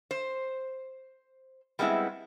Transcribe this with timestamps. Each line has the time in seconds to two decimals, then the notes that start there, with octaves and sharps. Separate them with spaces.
0.11 C5
1.79 G3 G#3 B3 C4 E4